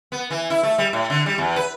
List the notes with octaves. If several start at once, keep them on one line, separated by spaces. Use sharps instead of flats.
B3
E3
E4
A3
G3
A2
D3
G3
E2
B4